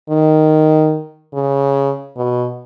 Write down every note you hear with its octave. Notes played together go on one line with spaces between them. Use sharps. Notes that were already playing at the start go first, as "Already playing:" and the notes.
D#3
C#3
B2